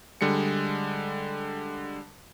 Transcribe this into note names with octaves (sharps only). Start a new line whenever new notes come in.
D3 G3 G#3 C#7